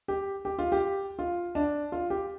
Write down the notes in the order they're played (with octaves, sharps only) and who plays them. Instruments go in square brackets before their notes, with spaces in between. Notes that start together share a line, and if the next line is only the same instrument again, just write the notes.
[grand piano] G4
G4
F4
G4
F4
D4
F4
G4